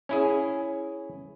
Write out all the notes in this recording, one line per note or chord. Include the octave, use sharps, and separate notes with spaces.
C#4 E4 G#4